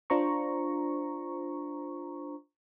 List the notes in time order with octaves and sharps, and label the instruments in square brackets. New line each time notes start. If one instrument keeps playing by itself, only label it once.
[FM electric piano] D4 F4 C5 A#5 C#6